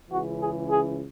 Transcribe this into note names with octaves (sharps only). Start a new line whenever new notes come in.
C#2 C#3 E3 F#4
G#4
G#4